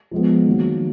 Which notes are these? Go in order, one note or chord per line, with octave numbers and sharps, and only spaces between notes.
F3 G#3 B3
D#3 F#3 A#3